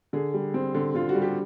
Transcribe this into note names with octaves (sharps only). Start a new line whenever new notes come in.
D3 G#4
G3
C4
D3
D3 F4
F#4
G3
G4